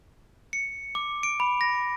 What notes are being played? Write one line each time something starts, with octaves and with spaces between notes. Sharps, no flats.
C#7
D6
D7
B5
A#6